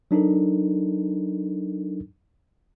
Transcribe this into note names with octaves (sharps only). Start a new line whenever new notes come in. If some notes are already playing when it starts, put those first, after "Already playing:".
F#3 D4 D#4 A4 A#4